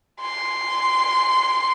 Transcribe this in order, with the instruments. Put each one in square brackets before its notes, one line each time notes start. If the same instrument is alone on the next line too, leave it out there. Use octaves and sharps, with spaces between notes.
[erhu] C6